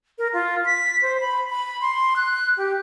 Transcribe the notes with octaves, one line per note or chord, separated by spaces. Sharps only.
A#4
F4
B6
C5
B5
B5
C6
F#6
G4